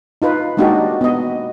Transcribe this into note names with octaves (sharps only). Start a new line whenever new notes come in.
D#4 F4 B4
G#3 A#3 D4 D#4 F#4 G4
B3 D#5